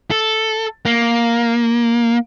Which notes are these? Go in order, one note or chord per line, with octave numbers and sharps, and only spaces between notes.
A4
A#3